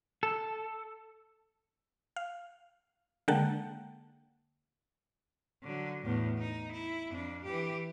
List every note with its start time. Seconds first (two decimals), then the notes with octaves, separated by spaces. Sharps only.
0.23 A4
2.16 F5
3.28 D3 G#3 A#3 F#5 G5 A5
5.63 D3 F#3
6.02 E2 A2
6.39 D#4
6.72 E4
7.10 F2 D4
7.45 E3 G4